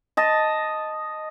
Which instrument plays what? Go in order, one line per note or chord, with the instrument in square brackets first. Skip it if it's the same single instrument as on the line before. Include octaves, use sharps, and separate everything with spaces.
[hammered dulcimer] D#5 A5